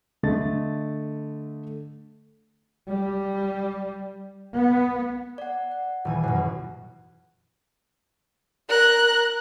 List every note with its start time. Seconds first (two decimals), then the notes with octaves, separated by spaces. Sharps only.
0.23 D3 A3 D#5 A6
2.88 G3
4.54 B3
5.38 D5 F#5
5.72 F#5
6.05 D#1 E3 G#5
6.24 F#2 B2 F#5
8.69 A#4 F#6